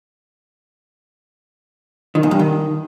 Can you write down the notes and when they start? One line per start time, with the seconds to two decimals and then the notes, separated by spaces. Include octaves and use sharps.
2.15 D#3
2.23 E2
2.31 G2
2.39 D#3